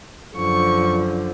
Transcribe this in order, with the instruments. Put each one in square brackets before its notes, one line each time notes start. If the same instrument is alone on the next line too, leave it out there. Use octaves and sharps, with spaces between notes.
[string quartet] F#2 D3 F3 C#6